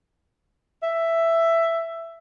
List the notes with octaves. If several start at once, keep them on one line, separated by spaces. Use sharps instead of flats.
E5